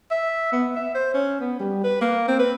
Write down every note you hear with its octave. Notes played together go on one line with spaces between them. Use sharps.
E5
B3
E5
C5
C#4
B3
G3
B4
A#3
C4
B4